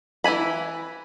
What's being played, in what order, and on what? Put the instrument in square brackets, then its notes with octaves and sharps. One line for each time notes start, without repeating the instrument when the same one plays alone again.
[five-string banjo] E3 E4 G#5 B5